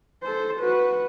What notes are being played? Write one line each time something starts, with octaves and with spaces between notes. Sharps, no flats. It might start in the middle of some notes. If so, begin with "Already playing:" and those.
A4 C5
F#4 B4